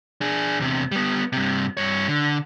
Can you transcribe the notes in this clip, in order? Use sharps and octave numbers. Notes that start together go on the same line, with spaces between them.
D4 G#4
E2 C3
G3 B3
G2 C3
G2 C#5
D3